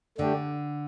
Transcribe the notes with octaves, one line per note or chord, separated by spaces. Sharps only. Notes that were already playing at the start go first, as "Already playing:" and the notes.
D3 A3 D4 G4